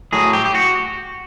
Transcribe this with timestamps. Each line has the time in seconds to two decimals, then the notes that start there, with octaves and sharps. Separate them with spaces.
0.12 A2 F#3 G#4
0.33 G4
0.45 G4
0.55 F#4